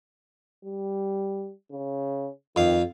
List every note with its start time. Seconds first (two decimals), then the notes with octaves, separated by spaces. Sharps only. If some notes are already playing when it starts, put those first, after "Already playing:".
0.65 G3
1.72 C#3
2.56 F2 D#3 F5